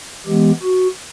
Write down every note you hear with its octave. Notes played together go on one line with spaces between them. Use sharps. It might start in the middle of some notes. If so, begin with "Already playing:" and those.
E3 G#3 B3 G4
F#4